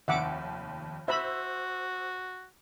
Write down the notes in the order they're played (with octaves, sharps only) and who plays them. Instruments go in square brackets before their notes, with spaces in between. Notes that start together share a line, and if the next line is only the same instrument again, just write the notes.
[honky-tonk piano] F1 D#2 [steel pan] E5 F#5 D6
[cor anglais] F#4 [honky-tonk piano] C5 E6 [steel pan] E5 B5